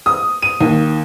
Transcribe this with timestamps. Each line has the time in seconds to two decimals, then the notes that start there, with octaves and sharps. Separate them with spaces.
0.06 D#6
0.42 D#7
0.61 D#2